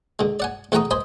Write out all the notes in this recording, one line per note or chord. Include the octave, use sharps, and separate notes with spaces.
D3 G#3
D5 F#5 G#5
E2 A3 F#5 G5 A#5 D#6
C5 D#5 G#5 B5